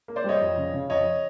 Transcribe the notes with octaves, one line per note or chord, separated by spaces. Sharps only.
A#3
C5 D5
G3 C#5 D#5
F2
C#3
C#3
F2 C#5 D#5